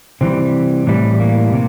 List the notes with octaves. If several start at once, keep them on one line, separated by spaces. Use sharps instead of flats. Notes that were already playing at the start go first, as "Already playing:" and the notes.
C3 E3 G3 C4
A2 E3 G3
A#3
C3